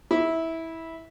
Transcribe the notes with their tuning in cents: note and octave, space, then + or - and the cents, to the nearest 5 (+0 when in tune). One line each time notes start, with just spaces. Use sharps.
E4 -15